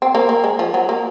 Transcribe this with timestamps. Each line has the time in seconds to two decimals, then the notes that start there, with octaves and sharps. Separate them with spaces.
0.02 C4
0.15 A#3
0.29 A#3
0.44 G#3
0.59 F3
0.74 F#3
0.89 A#3